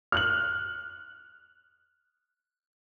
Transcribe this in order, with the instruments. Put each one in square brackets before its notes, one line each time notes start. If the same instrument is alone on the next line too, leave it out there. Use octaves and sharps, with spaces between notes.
[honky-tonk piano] F6 F#6 F#7